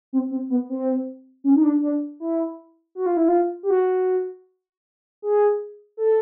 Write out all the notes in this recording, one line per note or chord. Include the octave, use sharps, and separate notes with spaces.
C4
C4
B3
C4
C#4
D#4
D4
D4
E4
F#4
F4
E4
F4
G4
F#4
G#4
A4